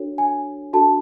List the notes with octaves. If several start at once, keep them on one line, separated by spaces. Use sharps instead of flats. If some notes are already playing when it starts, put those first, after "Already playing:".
Already playing: D4 F#4 A4 C#5
G#5
D4 F#4 A4 A5